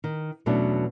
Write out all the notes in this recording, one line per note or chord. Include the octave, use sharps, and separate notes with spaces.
D#3
E2 B2 F#3 A3 C#4 D4